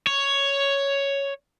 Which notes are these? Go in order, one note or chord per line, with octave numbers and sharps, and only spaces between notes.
C#5